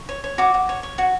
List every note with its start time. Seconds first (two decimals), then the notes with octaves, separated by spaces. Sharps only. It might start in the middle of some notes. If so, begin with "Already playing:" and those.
Already playing: C#6
0.09 C#5
0.24 C#5
0.38 F#4 D6
0.54 F#4
0.69 C#5
0.83 C#5
0.98 F#4